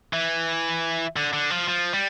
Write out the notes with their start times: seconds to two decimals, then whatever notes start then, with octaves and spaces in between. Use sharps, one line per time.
0.13 E3
1.16 D3
1.33 D3
1.50 F3
1.68 F3
1.93 G3